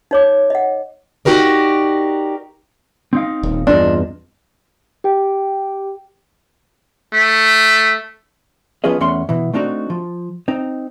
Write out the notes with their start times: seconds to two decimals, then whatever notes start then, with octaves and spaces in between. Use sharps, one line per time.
0.11 D#4 C#5 D6
0.50 D#5 F#5
1.25 D#4 F#4 G4 A#4 D5
3.13 C4 D#4 F5
3.43 D#1
3.67 E2 G2 C4 D4 F4 D#5
5.04 G4 G5
7.13 A3
8.84 F3 B3 C#4 F4 G#4 D#5
9.01 E2 A3 C#4 F#5 C6
9.29 B2 E3
9.53 A3 C4 D4 D#4 F#4
9.90 F3
10.48 C4 D#4